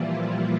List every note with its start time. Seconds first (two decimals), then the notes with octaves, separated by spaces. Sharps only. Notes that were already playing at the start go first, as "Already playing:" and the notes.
Already playing: A#2 E3 F3 G3 A#3 E4 F4